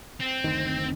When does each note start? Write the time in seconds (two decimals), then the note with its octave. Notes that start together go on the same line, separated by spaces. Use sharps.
0.21 C4
0.44 F#1 D2 D#3